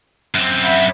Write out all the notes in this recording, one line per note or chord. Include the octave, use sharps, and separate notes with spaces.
F#2 C4
E5 F#5 B5